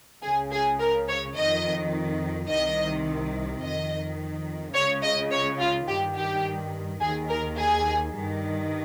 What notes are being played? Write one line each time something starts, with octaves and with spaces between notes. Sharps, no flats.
C#2 C#3 G#4
G#4
A#4
C#5
F2 D#3 D#5
C2 C3 D#3 D#5
F2 D#3 D#5
C#2 C#3 C#5
D#5
C#5
F4
G2 D#3 G4
G4
D#2 D#3 G#4
A#4
G#4
G2 D#3